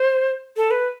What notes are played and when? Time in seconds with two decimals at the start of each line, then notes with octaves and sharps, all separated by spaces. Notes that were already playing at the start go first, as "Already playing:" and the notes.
Already playing: C5
0.57 A4
0.71 B4